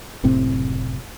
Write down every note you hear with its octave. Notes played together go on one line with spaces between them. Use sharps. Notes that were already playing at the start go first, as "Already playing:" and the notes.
F#1 A2 C3 C4